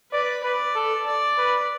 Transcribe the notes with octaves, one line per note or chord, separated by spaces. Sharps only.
B4 D5
B4 D5
A4
D5
B4